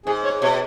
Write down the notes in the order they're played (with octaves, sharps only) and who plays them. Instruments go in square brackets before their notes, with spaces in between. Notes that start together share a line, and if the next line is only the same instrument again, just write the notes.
[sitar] G#2 [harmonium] G#4
[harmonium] C#5
[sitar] B2 [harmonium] C#5